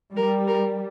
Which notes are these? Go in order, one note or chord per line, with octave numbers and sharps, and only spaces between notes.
G3 A#4
A#4